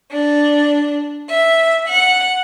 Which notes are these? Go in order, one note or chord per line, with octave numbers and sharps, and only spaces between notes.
D4
E5
F#5